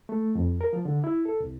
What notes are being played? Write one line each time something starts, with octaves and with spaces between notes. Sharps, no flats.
A3
F2
A#4
F3
D3
E4
A4
C2